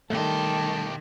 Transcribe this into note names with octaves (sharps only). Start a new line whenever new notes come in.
B1 D#3 G3 A3 G4 A5